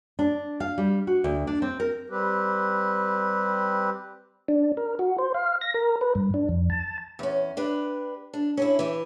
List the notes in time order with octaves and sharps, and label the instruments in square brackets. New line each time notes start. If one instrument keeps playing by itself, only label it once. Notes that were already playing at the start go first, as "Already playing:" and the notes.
[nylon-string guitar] D4
F5
G3
F#4
D2
D4
C4
A#4
[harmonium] G3 C4 G4 B4
[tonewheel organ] D4
A#4
F#4
C5
F5
A#6
A#4
B4
G2
D4
F2
A5
[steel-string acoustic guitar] E2 C#4
D4 G4 B4
D4
C#4 D4 E4
E3 G4